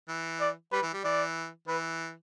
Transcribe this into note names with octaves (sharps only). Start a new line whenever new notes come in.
E3
D5
G3 B4
E3
G3
E3 D5
E3 B4